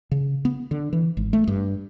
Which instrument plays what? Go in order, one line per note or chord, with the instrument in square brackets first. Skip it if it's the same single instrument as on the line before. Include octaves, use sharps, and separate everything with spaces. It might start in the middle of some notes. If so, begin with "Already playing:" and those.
[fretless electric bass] C#3
B3
D3
E3
G#1
A3
G2